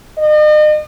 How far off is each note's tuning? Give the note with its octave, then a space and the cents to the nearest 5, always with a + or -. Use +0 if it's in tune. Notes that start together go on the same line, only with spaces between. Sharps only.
D#5 -40